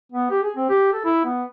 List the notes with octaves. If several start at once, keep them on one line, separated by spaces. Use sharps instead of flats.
B3
G4
G#4
C4
G4
A4
E4
B3